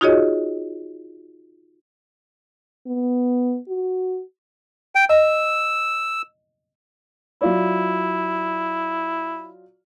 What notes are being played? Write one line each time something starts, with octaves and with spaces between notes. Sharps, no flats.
D#4 F4 F#4 G#4 C#5 D#5
B3
F#4
G5
D#5 E6
F#3 E4 F4 D5